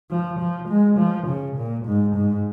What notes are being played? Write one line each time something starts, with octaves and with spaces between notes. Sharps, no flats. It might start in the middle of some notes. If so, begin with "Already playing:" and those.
F3
F3
G#3
F3
C#3
A#2
G#2
G#2